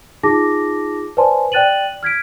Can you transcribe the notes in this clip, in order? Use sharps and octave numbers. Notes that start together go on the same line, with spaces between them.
D#4 F4 G#4 A5 D6 A#6
B4 C5 D5 G#5 A5 C6
D5 G5 F#6 A6 D#7 F#7
F6 G#6 B6 D7